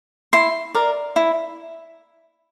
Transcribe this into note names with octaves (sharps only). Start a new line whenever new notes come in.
E4 C6
A#4 D5
E4